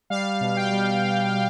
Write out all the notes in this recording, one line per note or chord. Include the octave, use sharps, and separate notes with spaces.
G3 F5
B2
G5
G3
B2
G3